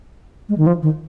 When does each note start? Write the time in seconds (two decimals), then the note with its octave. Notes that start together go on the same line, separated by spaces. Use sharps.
0.49 G#3
0.58 D#3
0.66 F3
0.82 D#3